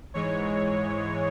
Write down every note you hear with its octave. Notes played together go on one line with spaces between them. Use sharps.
G#2 E3 G#3 C#5